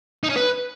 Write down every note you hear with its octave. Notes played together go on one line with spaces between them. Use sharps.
D#4
C#4
B4